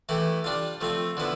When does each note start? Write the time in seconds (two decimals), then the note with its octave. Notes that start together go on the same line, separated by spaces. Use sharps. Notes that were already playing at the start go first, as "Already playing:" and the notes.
0.09 E3 A3 E4 G4
0.44 G3 D4 F4
0.81 F3 A3 C4 F4
1.17 D3 F3 B3 E4